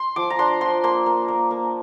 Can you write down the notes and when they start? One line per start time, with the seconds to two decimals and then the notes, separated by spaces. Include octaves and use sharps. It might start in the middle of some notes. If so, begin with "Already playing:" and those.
Already playing: C6
0.16 F3 D6
0.30 A#5
0.39 D4 C6
0.61 F3 C6
0.84 A#3 C6
1.06 A#3
1.28 A#3
1.51 A#3